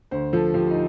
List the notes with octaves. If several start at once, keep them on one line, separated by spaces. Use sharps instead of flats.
D2 C5
F3 A4
F3 G4
D#4